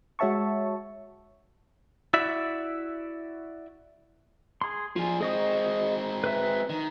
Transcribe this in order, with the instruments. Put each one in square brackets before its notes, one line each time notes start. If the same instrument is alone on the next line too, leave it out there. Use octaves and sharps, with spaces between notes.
[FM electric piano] G#3 F#4 C#5 E5 A5 C#6
[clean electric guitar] E4 F#4 D5 E5
[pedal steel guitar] G#4 C6
[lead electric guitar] F3 G#4 [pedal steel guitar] F4
[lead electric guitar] G#3 C4 [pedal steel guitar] G#4 D#5 C#6
[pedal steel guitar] B4 E5
[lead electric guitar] D#3